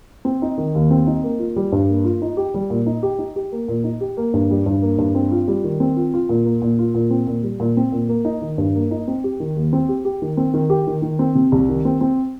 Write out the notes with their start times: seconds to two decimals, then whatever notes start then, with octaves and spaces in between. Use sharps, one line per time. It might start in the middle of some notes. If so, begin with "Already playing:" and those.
0.25 C4
0.42 D#4
0.58 D#3
0.75 D#2
0.91 C4
1.07 D#4
1.24 A#3
1.39 F4
1.56 G3
1.72 G2
1.89 A#3
2.04 F4
2.22 D#4
2.37 G4
2.54 G3
2.70 A#2
2.86 D#4
3.03 G4
3.19 D#4
3.36 G4
3.52 A#3
3.68 A#2
3.84 D#4
4.01 G4
4.17 A#3
4.34 G2
4.50 G3
4.66 G2
4.82 A#3
4.98 G2
5.15 C4
5.31 F4
5.48 G3
5.64 D#3
5.80 C4
5.97 F4
6.14 F4
6.29 A#2
6.45 A#3
6.62 A#2
6.79 F4
6.95 A#2
7.10 C4
7.27 A#2
7.43 G3
7.60 A#2
7.77 C4
7.92 A#2
8.09 A#3
8.25 D#4
8.42 D#3
8.58 G2
8.75 A#3
8.91 D#4
9.08 C4
9.24 G4
9.40 D#3
9.56 D#2
9.73 C4
9.89 G4
10.05 G4
10.22 D#3
10.37 C4
10.54 D#3
10.70 G4
10.87 D#3
11.02 D#3
11.19 C4
11.35 C3
11.52 C2
11.69 D#3
11.85 C4
12.01 C4